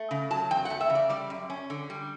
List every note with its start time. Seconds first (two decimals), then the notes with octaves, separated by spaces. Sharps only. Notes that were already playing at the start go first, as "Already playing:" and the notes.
Already playing: A3
0.11 C#3
0.30 F#3 A5
0.51 E2 G5
0.65 F#5
0.70 A3
0.81 E5
0.90 C#3
0.95 D5
1.09 G3 D5
1.30 F#2
1.50 C#4
1.70 D3
1.90 G3